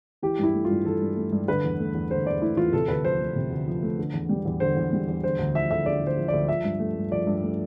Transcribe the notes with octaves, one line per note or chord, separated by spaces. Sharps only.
E3 G4
G2
E4
A3
F4
G2
E3 A4
G2
A3
G2
D3 B4
E2
A3
E2
D3 C5
E2 D5
A3 E4
E2 F4
C3 A4
D2 B4
F3 C5
A3
C3
D2
F3
A3
D3
E2
G3
E2
D3 C5
E2
G3
E2
D3 C5
D2
F3 E5
D2 E5
D3 D5
D2
C5
F3
D2 D5
F3 E5
G2
A3
G2
F3 D5
G2
A3